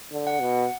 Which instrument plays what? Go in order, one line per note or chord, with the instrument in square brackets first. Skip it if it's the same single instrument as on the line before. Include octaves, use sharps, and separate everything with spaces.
[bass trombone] D3
[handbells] F#5
[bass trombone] B2